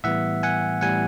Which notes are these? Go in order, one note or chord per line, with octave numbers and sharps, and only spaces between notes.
A2 E3 G3 B3 E5 F#5
F#5 G#5
A2 E3 G3 B3 F#5 G#5